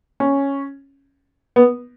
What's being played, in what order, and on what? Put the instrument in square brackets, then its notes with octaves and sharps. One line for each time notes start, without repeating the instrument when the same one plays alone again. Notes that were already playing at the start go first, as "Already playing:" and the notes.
[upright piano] C#4
B3